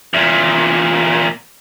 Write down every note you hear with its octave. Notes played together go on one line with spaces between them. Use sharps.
E2 A#2